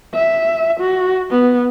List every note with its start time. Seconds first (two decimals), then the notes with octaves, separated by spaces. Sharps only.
0.14 E5
0.80 F#4
1.31 B3